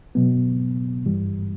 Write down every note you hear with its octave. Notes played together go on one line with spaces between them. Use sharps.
B2 F#3 B3
G2 E3 G3